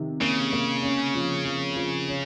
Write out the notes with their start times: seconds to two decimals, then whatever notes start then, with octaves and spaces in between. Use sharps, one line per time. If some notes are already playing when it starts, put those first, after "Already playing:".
Already playing: C3 D#3
0.21 C#3 A#3
0.52 A#3
0.83 C#4
1.14 F3
1.45 F3
1.76 F3
2.08 C#4